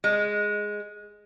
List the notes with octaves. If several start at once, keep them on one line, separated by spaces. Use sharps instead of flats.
G#3